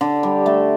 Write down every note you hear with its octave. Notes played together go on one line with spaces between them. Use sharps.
D3
G3
A3